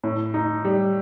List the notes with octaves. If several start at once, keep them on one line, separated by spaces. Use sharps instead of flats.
A2
D#4
G3